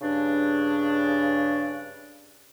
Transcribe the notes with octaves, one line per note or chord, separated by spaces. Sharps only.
G2 C#3 D4